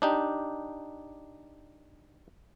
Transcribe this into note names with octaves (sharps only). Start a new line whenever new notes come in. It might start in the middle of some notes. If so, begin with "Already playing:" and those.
D4 D#4 G4